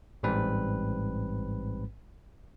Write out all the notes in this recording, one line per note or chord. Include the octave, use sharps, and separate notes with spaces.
A1 G#2 G3 C4 B4